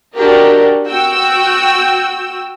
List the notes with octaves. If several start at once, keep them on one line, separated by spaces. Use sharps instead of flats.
D4 F#4 G4 A#4 D#5
F#4 G5 E6